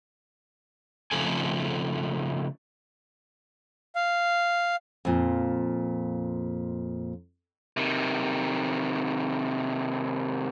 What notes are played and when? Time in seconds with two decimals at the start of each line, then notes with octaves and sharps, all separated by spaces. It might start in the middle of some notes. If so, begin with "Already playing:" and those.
1.11 C#3 F3 A3 C4 A4 G#5
3.95 F5
5.05 F2 A#2
7.77 C3 D#3